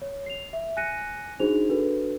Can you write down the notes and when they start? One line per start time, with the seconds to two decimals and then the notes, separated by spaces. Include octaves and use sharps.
0.02 C#5
0.26 C7 F7
0.53 E5
0.77 G#5 F#6 A#6 C#7 D#7
1.40 D4 D#4 F#4 G#4 C5 F7
1.69 D4 F#4 A4 B4